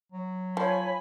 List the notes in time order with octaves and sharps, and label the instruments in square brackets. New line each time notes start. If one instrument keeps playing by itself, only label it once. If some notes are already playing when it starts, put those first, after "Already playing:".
[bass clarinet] F#3
[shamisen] F3 [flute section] C#5 [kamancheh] G#5 B5